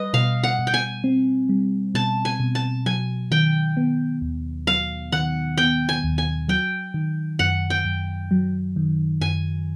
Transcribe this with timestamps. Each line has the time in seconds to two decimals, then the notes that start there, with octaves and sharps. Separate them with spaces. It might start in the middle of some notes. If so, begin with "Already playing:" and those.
Already playing: G3 B4 D#5
0.13 B2 F5
0.43 F#5
0.59 B2
0.67 G5
0.74 G#5
1.04 C4
1.49 G3
1.94 B2 A5
2.25 G#5
2.40 B2
2.55 A5
2.86 F#3 G#5
3.31 D#3 G5
3.77 B3
4.22 D#2
4.67 F#3 F5
5.12 D#3 F#5
5.57 B3 G5
5.89 G#5
6.04 D#2
6.18 G#5
6.48 F#3 G5
6.94 D#3
7.39 F#2 F#5
7.70 G5
7.85 F#2
8.31 F#3
8.76 D#3
9.21 F#2 G#5